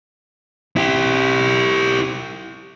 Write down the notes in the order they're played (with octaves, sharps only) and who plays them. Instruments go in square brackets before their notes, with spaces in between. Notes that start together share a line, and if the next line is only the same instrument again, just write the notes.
[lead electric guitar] E4 G4